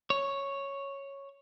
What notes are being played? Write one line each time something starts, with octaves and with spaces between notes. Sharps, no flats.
C#5